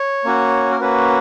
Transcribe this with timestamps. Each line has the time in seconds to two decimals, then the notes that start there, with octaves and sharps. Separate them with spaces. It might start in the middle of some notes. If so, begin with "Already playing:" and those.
Already playing: C#5
0.25 A#3 C#4 F#4
0.71 A#4
0.81 A#3 C#4 F#4 B4